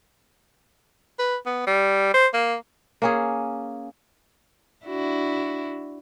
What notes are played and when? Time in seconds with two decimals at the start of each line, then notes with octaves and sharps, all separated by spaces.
1.19 B4
1.46 B3
1.67 G3
2.14 C5
2.33 A#3
3.02 A#3 C#4 G#4
4.85 D4 E4 F#4